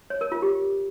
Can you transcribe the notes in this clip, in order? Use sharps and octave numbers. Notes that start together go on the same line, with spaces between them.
C#5
A#4
F4
G4